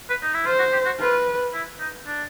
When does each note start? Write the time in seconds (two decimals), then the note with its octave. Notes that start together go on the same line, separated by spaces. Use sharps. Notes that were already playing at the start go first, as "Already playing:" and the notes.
0.10 B4
0.23 D#4
0.34 E4
0.46 F4 C5
0.59 F#4
0.73 G4
0.86 F#4
0.99 F4 B4
1.54 E4
1.80 D#4
2.07 D4